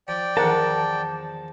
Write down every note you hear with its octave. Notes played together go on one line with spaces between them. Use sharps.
F3 D5 G5
E2 D#3 F3 A#4 F#5 A5